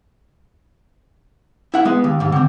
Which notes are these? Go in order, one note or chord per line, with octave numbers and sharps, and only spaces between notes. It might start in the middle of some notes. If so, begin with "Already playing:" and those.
E4 F#5
G#3 B3
D#2
D#2 G#2
D3 C4